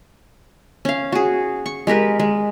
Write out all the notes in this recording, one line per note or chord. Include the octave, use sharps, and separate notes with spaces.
C#4 F5
F#4 G#4
C#6
G#3 G4 A#4 B4
G#3